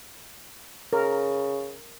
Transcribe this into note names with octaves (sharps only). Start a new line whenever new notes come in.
C#3 A#4